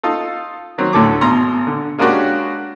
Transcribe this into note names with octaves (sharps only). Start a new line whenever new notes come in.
D#4 F4 A4
D#3 F#3 C4
D2 A2 D3 A4 C#5 D6
G#1 B2 A#5 C6
D3
G#3 A#3 C#4 D4 F#4 G4